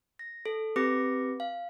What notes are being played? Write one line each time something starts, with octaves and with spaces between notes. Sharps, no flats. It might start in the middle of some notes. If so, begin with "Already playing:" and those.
A#6
A4
C4 G4 B4 D6 A#6 C#7
F5